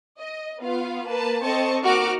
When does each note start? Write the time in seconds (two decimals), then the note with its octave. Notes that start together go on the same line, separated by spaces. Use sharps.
0.18 D#5
0.60 B3 F4 F5
1.07 A#3 B4 A5
1.43 C4 A4 C5 D#5 A5 C#6
1.84 A#3 D#4 F#4 C#6 D6 F6